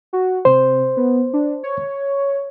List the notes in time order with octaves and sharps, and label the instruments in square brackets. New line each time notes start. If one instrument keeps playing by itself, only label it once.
[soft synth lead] F#4
[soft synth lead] C3 [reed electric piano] C5
[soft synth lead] B3
D4
C#5